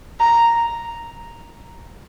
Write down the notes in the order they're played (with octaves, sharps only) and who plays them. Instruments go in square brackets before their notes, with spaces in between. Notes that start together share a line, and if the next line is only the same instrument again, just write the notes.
[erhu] A#5